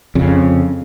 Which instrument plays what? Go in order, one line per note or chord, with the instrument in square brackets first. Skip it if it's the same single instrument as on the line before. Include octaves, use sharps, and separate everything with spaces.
[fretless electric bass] F2 C#3